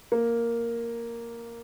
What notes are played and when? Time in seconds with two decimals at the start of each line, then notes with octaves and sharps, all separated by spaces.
0.12 A#3